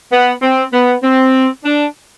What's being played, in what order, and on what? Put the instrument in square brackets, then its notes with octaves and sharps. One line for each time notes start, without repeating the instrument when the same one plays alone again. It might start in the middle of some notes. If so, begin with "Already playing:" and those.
[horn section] B3
C4
B3
C4
D4